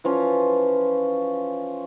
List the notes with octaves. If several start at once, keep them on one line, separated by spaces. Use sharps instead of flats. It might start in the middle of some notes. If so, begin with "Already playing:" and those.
E3 F3 C#4 F4